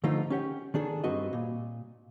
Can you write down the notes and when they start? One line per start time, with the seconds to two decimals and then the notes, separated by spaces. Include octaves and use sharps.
0.04 D3 F3 A3 D#4 F4
0.30 C#4 G4 F#5
0.74 D#3 D4 G#4 A4
1.04 G2 C4 F#4 B4 D#5
1.33 A#2